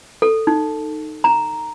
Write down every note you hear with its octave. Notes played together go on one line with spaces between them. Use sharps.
A4
D#4
A#5